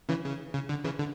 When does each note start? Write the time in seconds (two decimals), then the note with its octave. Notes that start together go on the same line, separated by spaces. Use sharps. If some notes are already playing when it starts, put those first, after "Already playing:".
0.09 C#3 E3
0.24 C#3
0.54 C#3
0.69 D3
0.84 C#3 E3
0.99 D3